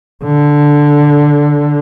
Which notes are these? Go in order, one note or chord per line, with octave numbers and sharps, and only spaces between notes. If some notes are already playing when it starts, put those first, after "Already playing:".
D3